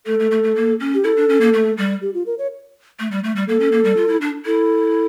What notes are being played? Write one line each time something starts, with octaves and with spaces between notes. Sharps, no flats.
A3 A4
A3
A3
A3
A#3
C#4
G4
E4 A4
D4
C#4
A#3
A3
G3
G4
F4
A#4
C#5
A3
G3
A3
G3
A#3 A4
C#4
A#3
G3
F4
E4
D4
E4 A4